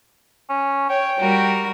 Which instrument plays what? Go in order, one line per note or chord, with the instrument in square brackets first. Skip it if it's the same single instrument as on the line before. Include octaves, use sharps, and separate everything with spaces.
[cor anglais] C#4
[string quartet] C#5 [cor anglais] G5
[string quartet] G3 F#4 A#4